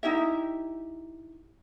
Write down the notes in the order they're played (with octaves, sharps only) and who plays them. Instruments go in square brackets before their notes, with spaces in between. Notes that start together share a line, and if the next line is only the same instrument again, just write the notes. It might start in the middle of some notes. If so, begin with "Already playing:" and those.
[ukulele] D#4 E4 G4 E5